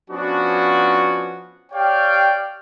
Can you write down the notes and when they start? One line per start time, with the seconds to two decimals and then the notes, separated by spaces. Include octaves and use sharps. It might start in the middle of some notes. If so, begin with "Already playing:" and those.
0.10 F3 B3 C#4 D4 F#4
1.72 G4 C#5 D5 F5 G5